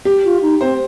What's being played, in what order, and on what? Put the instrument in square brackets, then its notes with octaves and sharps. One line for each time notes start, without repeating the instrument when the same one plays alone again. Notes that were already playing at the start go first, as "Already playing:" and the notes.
[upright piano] G4
[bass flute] F4
D#4
[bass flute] C4 [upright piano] C5